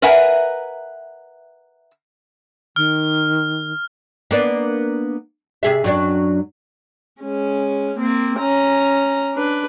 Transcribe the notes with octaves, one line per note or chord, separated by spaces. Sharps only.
A#4 B4 E5 F#5 G#5 A#5
D#3 F6
A#3 B3 D4
C3 G#4 E5
F#2 F#3 D4
G#3 C#4
A#3 C4
C#4 A#5
D4 B4